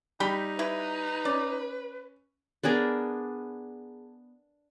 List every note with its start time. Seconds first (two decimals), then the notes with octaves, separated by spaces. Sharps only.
0.20 G3 D#4 G5 B5
0.59 E4 B4
1.25 C#4 D5
2.64 B3 D4 G#4 A#4